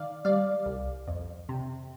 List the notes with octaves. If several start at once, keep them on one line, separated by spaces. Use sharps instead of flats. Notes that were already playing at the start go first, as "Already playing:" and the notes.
Already playing: D#3 D5 F5
G3 D5 F5
C2
F2
C3